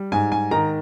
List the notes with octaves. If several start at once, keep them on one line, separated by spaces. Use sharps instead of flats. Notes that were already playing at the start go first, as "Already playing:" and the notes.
Already playing: G3
G#2 G#5
G#5
D#3 A#5